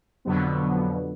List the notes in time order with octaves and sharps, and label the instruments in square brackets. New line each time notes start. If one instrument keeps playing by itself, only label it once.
[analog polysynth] F2 B2 D3 F#3 B3